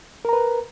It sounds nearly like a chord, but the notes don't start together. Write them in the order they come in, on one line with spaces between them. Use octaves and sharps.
A#4 A#5 B4